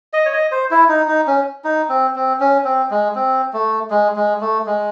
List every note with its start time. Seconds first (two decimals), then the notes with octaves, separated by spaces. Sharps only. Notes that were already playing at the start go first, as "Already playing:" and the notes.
0.13 D#5
0.26 C#5
0.33 D#5
0.52 C5
0.71 E4
0.89 D#4
1.08 D#4
1.27 C#4
1.64 D#4
1.89 C4
2.15 C4
2.40 C#4
2.65 C4
2.91 G#3
3.15 C4
3.53 A3
3.90 G#3
4.16 G#3
4.41 A3
4.66 G#3